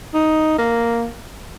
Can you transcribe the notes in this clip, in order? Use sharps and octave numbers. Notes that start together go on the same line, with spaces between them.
D#4
A#3